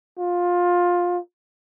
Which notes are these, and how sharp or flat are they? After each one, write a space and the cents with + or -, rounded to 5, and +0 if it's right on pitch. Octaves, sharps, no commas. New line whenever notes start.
F4 +15